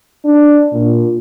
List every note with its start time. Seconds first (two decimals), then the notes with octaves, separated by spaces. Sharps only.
0.25 D4
0.72 A#2